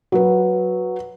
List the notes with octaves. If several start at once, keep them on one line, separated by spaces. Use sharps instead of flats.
F#3 B4